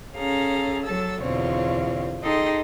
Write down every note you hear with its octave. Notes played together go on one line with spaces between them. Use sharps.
C#4 G#4 A4 F5 A#5
F#3 A4 A5 E6
E2 B2 D3 C4 F4 C#5
D#4 G#4 A4 D#5 G5 C6